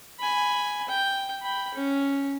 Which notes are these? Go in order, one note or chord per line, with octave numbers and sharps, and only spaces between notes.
G#5 B5
G5
G5 B5
C#4